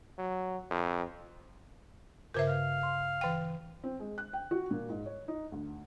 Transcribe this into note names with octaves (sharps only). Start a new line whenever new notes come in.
F#3
F2
G2 C#3 A#4 C5 E5
F5
C6
E3 G5
C4
G#3
F#6
G5
F#4
A#2
G#2
C#5
D#4
D2